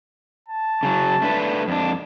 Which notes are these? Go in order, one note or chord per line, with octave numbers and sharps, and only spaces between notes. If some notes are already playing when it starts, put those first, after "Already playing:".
A5
C#3 F#3
A3 D4 B4
F2 D4